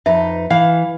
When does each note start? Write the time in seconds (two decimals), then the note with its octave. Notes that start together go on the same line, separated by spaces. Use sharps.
0.06 F2 D#4 B4 E5
0.50 E3 F5